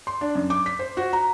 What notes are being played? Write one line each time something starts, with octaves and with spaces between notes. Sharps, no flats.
C6
D4
F#2
D6
B6
C5
F#4
A#5